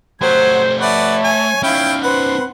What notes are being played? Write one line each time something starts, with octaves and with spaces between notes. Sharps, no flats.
F#3 A3 G4 C5 F#5 G#6
B4 C#5 D5 E5 F#5 A5
G#5
C#4 D#4 E4 F5 G5 F6
B4 C5 F#5